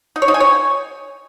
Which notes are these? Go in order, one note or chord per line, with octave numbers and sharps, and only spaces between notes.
D#4
C#5
D#4
G#5
C#5